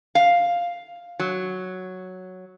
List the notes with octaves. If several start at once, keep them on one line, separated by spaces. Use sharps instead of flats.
F5
F#3